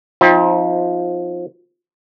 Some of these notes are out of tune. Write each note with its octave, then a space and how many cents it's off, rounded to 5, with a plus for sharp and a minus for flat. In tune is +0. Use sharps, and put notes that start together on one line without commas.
F3 +15 C4 +10 D#4 +40